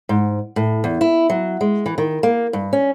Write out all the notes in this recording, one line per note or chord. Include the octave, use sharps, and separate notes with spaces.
G#2
A2
E2
E4
F#3
G#3
E3
D#3
A#3
G2
C#4